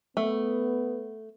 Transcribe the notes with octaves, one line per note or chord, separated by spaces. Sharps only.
A3 B3